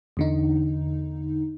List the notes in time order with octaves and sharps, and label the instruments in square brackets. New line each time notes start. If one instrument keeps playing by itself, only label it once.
[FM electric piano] E2 D3 D#4